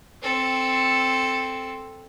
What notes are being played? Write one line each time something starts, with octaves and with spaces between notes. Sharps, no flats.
C4 A4